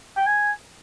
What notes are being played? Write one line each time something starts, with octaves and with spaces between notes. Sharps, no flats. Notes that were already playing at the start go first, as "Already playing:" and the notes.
G5
G#5